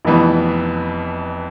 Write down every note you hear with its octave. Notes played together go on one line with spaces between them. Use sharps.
F1 F2 E3 B3